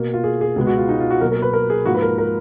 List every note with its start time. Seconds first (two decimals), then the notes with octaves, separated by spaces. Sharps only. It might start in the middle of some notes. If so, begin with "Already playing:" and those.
Already playing: B2 A#3
0.14 F4
0.24 G#4
0.41 G#4
0.56 C#2 B2 G#3 B3 G#4
0.67 F#4
0.77 F4
0.89 D#4
1.00 F4
1.11 F#4
1.21 B2 F#3 A#3 A#4
1.32 A#4
1.42 B4
1.53 A#4
1.70 G#4
1.85 G#2 F3 A#3 F#4
1.95 B4
2.02 A#4
2.18 A#4